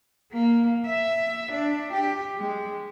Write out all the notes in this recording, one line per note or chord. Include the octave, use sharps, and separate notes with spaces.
A#3
E5
D4
G4
G#3